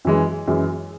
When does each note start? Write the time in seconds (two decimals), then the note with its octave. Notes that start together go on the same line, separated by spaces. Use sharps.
0.05 F#2 E3 G#3
0.47 F#2 E3 G#3